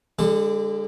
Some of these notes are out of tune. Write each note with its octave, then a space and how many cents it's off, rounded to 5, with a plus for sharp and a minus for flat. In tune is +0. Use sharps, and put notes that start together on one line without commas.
D3 +0 G#3 -40 D5 +0